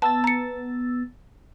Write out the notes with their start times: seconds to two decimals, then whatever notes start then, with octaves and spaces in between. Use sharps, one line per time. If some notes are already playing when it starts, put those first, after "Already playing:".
0.02 B3 A5 E6 A6
0.24 A#5 C#7